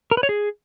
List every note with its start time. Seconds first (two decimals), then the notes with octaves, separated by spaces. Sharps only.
0.11 A#4
0.17 B4
0.23 C#5
0.29 G#4